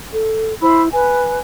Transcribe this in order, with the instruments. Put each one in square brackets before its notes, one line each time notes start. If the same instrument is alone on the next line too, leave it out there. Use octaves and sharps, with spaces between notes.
[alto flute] A4
[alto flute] E4 [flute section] C5 B5 E6
[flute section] B4 [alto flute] G#5